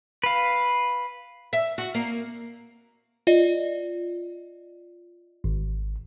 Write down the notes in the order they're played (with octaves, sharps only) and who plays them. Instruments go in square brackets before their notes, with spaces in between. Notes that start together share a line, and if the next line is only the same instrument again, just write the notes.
[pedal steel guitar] B4 F5
[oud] E5
F#4
A#3
[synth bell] F4 D5 D#5
[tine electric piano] G#1